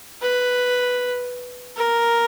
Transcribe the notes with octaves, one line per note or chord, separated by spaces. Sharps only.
B4
A#4